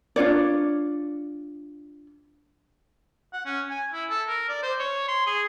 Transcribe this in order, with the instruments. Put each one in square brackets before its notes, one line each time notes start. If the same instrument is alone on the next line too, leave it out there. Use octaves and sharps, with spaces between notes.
[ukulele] D4 F4 C#5 D5
[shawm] F#5
C#4
G#5
E4
A4
A#4
D5
C5
C#5
C6
G#4